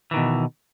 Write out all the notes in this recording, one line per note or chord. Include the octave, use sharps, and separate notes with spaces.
B2 D#3 E3